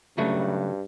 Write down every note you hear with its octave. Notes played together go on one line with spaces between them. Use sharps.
G2 C#3 F#3 A3